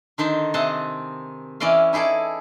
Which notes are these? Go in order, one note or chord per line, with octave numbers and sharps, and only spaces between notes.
D3 D#3 D#4 C5 A5
C3 C4 G#4 D#5 F#5 A5
E3 C#4 D5 D#5 F5
D#4 E4 G#4 A4 D5